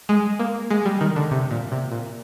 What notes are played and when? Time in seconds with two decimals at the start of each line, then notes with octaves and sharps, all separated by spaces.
0.09 G#3
0.39 A#3
0.70 G#3
0.85 G3
1.01 D#3
1.16 D3
1.31 C3
1.51 A#2
1.72 C3
1.92 A#2